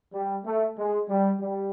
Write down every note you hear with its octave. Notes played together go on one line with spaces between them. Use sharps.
G3
A3
G#3
G3
G3